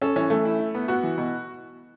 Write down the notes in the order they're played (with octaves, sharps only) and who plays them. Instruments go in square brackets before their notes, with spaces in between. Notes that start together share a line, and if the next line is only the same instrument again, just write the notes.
[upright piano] C#4 [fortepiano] A4
[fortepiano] E3 [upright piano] C#4
[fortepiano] E3 [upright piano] A3
[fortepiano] E4
E4
B3
[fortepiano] B3 [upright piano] F#4
[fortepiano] E3
B2